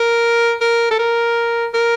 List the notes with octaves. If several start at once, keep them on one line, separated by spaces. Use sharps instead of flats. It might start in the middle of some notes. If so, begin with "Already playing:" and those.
Already playing: A#4
A#4
A4
A#4
A#4